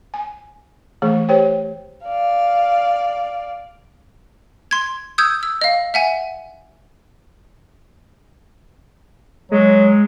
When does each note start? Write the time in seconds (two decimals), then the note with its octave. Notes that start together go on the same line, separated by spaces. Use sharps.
0.14 G#5
1.02 E3 A3 G#4
1.29 G4 C5 C#5 G5
2.05 D5 F5
4.71 C6 G#6
5.18 D#6 E6 G6 G#6
5.43 E6
5.61 D#5 F5
5.94 E5 F#5 G#5
9.52 F#3 G#3